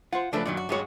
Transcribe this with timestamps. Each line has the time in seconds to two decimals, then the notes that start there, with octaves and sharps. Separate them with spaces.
0.13 F4 C5 F#5
0.33 C#3 F3 A3 D4 A4 B4
0.46 F#2 A#2 D#3 F#3 D5
0.57 F#4
0.69 G2 G3 G#3 F#4 C#5